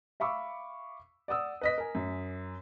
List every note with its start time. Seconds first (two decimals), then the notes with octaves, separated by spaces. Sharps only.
0.20 E5 F5 B5 C#6 D6 E6
1.28 D5 F#5 D#6 E6
1.61 B4 D#5 B6
1.78 A#4 G#5
1.95 F#2